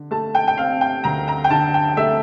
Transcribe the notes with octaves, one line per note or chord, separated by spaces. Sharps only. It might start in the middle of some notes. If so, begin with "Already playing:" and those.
Already playing: D3
A3 A5
G5
G5
C4 F5
G5
D2 A#5
A#5
G5
D3 A5
G5
A3 E5